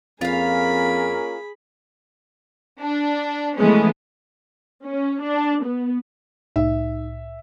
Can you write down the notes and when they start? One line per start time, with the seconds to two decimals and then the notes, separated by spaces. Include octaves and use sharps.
0.21 F2 A#3 C#4 F4 G#4 A#4 F5 B5
2.80 D4
3.57 E3 G#3 A3 B3 C#4
4.84 C#4
5.21 D4
5.64 B3
6.56 C2 A2 D#4 E5